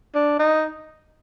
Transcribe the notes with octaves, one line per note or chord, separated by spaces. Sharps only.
D4
D#4